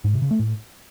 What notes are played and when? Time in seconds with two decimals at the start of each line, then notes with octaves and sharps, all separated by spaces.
0.04 G#2
0.13 C3
0.22 C#3
0.31 A3
0.39 A2